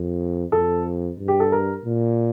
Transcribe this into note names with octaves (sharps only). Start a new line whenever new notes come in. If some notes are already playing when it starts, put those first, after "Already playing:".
Already playing: F2
F2 A4
G2
G4
A4
A#4
A#2